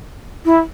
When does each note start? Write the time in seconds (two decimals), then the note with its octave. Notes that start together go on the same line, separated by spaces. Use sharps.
0.45 E4